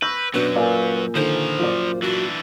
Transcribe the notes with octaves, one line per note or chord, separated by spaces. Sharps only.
B4 C#6 E6 G6 A#6
F#2 B2 F#3 D4 B4
A#2 A#3 D5 F5 G#5
D3 D#3 F3 A4 A#4 C5
F#2 A#2 F4 D5
E3 D4 F#4